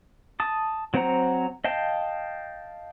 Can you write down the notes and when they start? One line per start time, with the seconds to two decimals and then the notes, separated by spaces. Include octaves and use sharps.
0.40 A5 D#6
0.94 F#3 C4 C5 F#5 A#5
1.64 D#5 F5 G5 A5